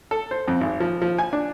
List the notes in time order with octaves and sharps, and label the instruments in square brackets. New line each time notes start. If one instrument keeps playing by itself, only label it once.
[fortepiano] A4
C5
F2
G#1
F3
F3
G#5
D4